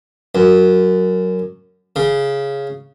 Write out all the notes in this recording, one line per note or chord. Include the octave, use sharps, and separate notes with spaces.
F#2
C#3